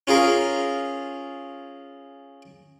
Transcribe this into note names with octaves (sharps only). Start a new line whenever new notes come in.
C#4 F4 G#4 A#4